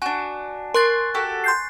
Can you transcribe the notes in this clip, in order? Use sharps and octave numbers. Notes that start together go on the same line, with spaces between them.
D4 F#4 G#5
A#4 C6 C#6 F#6 A6
F#4 G4 A4
C6 G6 C7